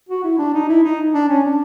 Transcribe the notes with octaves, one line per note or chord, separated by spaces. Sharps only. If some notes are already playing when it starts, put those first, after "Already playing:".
F#4
E4
D4
D#4
E4
D#4
D4
C#4
D4